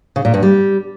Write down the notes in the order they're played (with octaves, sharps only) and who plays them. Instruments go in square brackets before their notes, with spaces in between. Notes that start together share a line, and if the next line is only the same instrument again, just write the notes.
[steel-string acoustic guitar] C#3
A#2
G2
G3